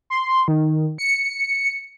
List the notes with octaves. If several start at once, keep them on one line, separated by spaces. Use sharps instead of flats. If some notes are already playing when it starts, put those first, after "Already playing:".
C6
D#3
C#7